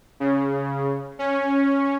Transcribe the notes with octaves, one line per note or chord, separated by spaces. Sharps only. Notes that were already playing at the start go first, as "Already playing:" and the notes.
C#3
C#4